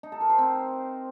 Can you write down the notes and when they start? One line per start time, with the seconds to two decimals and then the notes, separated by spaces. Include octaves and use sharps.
0.03 D#4
0.12 A4
0.21 A#4
0.30 C5
0.38 C4